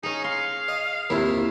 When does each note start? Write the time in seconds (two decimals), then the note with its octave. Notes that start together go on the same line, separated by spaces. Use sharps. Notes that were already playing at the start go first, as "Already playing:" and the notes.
0.03 C#4 D#4 G#4
0.24 F5 C6
0.68 D#5
1.10 D#2 C3 E4 F4